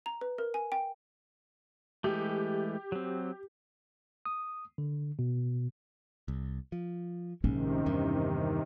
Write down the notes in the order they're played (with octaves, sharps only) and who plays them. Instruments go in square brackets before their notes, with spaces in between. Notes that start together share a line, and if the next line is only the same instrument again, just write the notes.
[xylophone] A#5
B4
A#4
G#5
G5
[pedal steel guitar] E3 G#3 A3 [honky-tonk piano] G4
[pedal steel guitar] F#3 C4
[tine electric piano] D#6
D3
B2
[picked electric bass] C2
F3
[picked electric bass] A#1 G#2 [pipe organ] C3 D#3 [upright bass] C#4
[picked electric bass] E2 G2